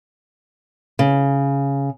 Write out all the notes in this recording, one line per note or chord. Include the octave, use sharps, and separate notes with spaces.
C#3